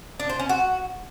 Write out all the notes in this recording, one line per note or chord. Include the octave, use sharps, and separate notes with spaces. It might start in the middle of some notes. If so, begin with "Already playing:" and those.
D4
C5
C#4
F#4